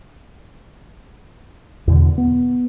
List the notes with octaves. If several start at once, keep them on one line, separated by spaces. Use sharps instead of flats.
E2 B2 D3
B3